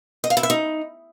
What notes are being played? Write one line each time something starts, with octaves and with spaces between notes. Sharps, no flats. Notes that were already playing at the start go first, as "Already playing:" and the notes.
D#5
F5
E4
E5
D#4